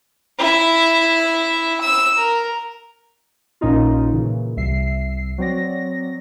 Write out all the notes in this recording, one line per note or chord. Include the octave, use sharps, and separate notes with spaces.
E4 E5
E6
A#4
A#1 A#2 C#4 D#4 F4
A#2 C#3 E3
C2 E5 C7
F#3 C4 D5 A#6